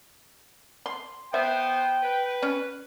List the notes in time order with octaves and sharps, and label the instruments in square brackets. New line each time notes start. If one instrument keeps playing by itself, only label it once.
[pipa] C6
[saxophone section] B3 C5 [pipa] E5 [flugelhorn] G5
[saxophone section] B4
[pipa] C#4